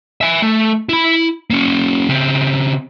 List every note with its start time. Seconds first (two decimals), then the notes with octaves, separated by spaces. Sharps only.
0.21 E5 G#5
0.42 A3
0.89 E4 B5
1.50 A#3 C#4
2.09 C#3 C4